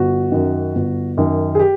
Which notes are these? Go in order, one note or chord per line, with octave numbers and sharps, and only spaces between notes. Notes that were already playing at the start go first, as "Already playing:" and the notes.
Already playing: G1 F#4
F#2 D#3
G1
F#2 D#3
G#4
G4